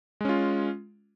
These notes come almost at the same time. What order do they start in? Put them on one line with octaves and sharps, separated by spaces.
G#3 C#4 F4